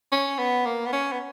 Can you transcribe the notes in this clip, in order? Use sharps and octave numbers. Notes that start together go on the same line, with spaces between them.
C#4
B3
A#3
B3
C#4
B3